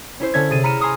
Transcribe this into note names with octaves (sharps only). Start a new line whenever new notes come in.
C#4 E4 C5
D3 C#4 E5 G#6
C3 G#4 A6 D#7
A#5 B5 F6 C#7 D#7 E7
G#5 A#5 C6 C#6 D#6 F6